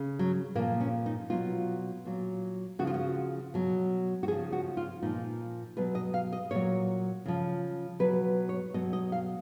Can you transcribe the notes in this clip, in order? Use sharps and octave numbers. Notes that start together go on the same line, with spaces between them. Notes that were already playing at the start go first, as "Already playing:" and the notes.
Already playing: C#3
F#3
A#2 F3 A#3
C#4
D#4
B2 F#3 F4
A#2 F#3
C#3 F3 F#4
F4
F#4
B2 F#3
F#4
C#3 F3 G#4
F#4
F4
A#2 F3 D#4
B2 F#3 B4
D#5
F5
D#5
A#2 F#3 C#5
C#3 F3
B2 F#3 B4
C#5
B2 F#3 D#5
D#5
F5